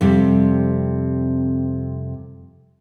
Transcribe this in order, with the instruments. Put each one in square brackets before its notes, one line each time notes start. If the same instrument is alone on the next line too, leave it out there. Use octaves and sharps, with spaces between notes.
[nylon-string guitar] F2 C3 G3